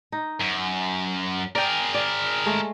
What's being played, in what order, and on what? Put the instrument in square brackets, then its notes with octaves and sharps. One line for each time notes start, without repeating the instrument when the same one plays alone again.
[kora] D#4
[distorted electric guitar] F#2
[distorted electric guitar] G#4 A#4 [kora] D5 G5
[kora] D5
G#3 A3